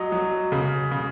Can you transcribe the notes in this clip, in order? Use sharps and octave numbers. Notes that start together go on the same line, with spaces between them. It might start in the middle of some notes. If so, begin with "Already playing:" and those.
Already playing: F#3 D#5
F#3
C#3
C#3